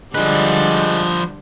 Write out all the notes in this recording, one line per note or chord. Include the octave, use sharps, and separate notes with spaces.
D3 F3 G3 G#3 B4 D5